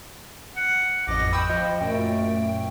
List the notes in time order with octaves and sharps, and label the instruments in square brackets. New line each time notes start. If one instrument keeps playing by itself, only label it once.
[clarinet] F#5
[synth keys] A1 F2 D#5 [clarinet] D6 [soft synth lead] A#6
[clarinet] G5 [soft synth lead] B5 [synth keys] C#6 D#6 E6
[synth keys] F3 [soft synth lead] D#5
[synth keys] F#2 A#2 [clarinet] A3 [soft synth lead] G5